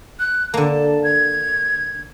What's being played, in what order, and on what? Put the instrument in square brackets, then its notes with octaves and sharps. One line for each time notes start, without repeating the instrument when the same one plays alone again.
[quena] F#6
[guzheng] D3 A#3 [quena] A5
[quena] G#6